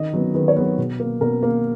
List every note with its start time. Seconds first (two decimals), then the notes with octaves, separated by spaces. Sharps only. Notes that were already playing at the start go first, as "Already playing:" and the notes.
Already playing: D#3 D#5
0.13 F#3 B3
0.35 D#3 B4
0.48 C#5
0.56 F#3 B3 B4
0.78 B2
1.00 A#3
1.21 B2 A#4
1.43 A#3